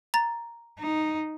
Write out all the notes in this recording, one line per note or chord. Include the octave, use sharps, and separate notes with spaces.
A#5 A6
D#4